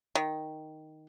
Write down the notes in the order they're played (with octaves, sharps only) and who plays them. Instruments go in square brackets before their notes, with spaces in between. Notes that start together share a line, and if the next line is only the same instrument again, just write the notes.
[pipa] D#3